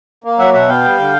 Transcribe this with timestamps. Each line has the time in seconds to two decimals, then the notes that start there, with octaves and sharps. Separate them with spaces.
0.24 A#3
0.39 F#3 E5 F#5
0.53 B2 E5 F#5
0.68 B3 F5 G5
0.84 G3
0.99 D3